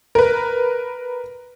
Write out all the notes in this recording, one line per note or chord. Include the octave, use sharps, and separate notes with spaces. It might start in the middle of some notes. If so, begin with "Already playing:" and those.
A#4 B4